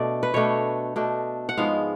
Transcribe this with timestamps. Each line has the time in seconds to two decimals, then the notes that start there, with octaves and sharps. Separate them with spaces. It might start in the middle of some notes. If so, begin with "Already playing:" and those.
Already playing: B2 A3 D4 D5
0.23 B4
0.34 B2 A3 D4 C#5
0.96 B2 A3 D4
1.49 F#5
1.57 G#2 F3 G#3 B3 F5